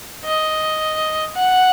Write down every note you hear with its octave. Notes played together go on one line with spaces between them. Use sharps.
D#5
F#5